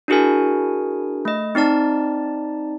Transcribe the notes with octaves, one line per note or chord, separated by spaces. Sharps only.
D4 E4 F#4 G#4 A#4 G#5
A3 D#5
C4 D#4 D5 A5